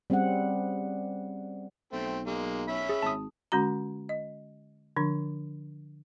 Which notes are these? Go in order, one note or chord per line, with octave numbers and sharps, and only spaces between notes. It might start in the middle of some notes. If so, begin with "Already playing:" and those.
G3 C4 C#4 G#4 F#5
B1 A3 C4
G#3 A#3
C#4 E5 B5
G#4
G#1 A5 D#6
D3 G#3 C#4 F#4 A#5
D#5
D3 F3 D4